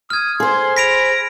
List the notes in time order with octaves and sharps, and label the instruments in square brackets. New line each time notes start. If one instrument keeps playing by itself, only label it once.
[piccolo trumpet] D#6 [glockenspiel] F6 G#6
[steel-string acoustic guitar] G#4 C5 [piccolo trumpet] C6
[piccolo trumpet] B5 [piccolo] A#6 [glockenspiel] B6 D7 F7